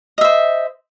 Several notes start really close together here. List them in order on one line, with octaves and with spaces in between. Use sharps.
D#5 E5 C5